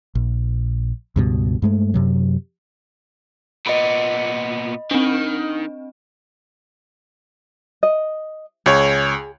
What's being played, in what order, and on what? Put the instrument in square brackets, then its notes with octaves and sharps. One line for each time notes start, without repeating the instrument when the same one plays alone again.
[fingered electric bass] A#1
C#2 G2 B2
G2 G#3 A3
F#2 C3 F#3
[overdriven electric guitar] A#2 B3 [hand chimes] D#5 B5
[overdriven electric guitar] D#3 [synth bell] C4 D4
[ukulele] D#5
[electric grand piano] C#2 C#5 [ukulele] G#4